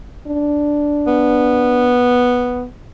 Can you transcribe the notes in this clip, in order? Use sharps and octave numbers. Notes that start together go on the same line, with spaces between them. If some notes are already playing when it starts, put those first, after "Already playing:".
D4
B3